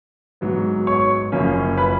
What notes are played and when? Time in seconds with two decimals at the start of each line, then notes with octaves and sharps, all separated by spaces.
0.41 G#2 F#3 B3
0.87 C#5 C#6
1.32 F#1 F#2 F3 A#3 C#4
1.77 B4 B5